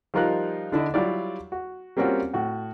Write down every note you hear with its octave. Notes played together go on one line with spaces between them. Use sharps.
F3 G3 D#4 F4 A#4 F#6
D3 D4 E4 D#5
F#3 G3 E4 F4 G4 D5
F#4
G3 A#3 C4 C#4 F4 F#4
A2 F#4